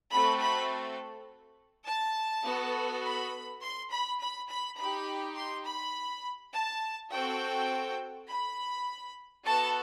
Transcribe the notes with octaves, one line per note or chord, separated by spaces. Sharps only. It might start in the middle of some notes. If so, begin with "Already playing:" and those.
A3 C4 F#4 A4 B5
B5
A5
B3 F#4 A4
B5
C6
B5
B5
B5
D#4 G4 B5
C6
B5
A5
C4 F#4 A4 G5
B5
B3 F#4 A4 A5